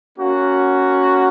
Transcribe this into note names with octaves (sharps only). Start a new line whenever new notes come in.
A#3 C#4 F#4